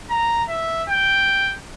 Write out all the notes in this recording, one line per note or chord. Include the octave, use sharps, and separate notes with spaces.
A#5
E5
G5